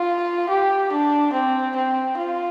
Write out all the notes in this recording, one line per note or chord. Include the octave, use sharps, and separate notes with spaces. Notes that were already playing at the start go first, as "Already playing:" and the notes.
Already playing: F4
G4
D4
C4
C4
F4